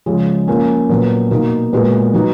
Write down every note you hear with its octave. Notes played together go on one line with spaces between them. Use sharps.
C#3 F3 G#3
F3 A#3 C#4
A#2 F#3 B3
B2 A#3 D#4 F#4
A#2 G#3 B3 F#4
F#3 B3 D#4 F#4